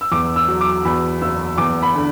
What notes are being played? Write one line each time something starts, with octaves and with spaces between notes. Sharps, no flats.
E6
E2 D6
E6
F#3
D6
E2 B5
F#1 E6
E2 D6
B5
D3